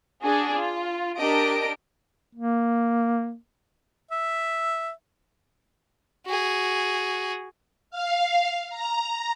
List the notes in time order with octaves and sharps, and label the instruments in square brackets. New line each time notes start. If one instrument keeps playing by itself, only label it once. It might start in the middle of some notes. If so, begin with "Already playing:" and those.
[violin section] D4 F#4 G#4
F4
D4 G4 A#4 D#5 D7
[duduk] A#3
[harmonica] E5
[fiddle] F#4 G#4
[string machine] F5
A#5